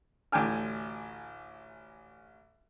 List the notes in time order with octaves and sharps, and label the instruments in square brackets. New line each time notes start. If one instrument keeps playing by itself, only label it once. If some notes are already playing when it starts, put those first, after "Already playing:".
[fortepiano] A1 D2 G5 G#5 F6